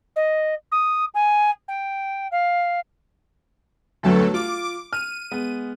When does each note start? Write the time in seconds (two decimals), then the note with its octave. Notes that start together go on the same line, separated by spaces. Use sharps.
0.16 D#5
0.72 D#6
1.14 G#5
1.68 G5
2.32 F5
4.03 G1 D2 F#3 A3 A4
4.34 F4 D6
4.93 F6 D#7
5.31 G#3 B3